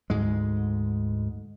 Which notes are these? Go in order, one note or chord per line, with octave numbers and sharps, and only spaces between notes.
D2 G#2 G#3